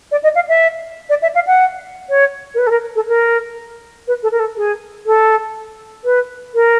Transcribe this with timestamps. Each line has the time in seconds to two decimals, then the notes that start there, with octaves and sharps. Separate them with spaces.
0.11 D5
0.23 D#5
0.35 F5
0.49 E5
1.10 D5
1.22 E5
1.35 F5
1.47 F#5
2.09 C#5
2.54 A#4
2.58 B4
2.67 A4
2.71 A#4
2.96 A4
3.08 A#4
4.08 B4
4.23 A4
4.32 A#4
4.40 A4
4.57 G#4
5.06 A4
6.05 B4
6.54 A#4